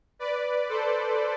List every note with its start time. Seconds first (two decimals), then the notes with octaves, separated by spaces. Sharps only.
0.19 B4 D5
0.69 A4 C5